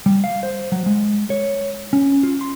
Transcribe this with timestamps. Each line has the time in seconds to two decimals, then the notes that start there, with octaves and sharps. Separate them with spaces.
0.06 G3
0.24 F5
0.43 C5
0.72 F#3
0.86 G#3
1.30 C#5
1.93 C#4
2.23 F4
2.41 C6